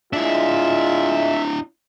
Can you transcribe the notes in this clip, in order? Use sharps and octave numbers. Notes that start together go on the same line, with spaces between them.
G#3 D4 E4 F4 E5